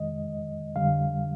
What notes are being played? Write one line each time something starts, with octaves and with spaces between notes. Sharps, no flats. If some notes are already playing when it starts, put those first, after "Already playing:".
Already playing: F2 D#3 G#3 D#5
F2 D3 G3 F5